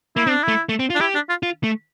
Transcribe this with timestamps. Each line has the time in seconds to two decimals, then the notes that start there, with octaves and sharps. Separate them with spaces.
0.16 A#3 E4
0.27 C4
0.30 D4
0.43 A3 E4
0.69 A3
0.79 C4
0.90 F4
0.95 D4
1.00 E4 G4
1.15 D4
1.29 F4
1.43 F4
1.64 A3